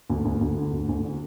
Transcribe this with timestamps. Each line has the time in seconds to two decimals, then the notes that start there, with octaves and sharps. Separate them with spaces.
0.10 D2
0.25 D2
0.41 D2
0.57 D3
0.73 D2
0.89 D2
1.05 D3